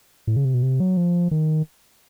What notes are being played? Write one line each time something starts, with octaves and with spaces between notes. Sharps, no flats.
A2
C#3
C3
B2
C3
F#3
F3
D#3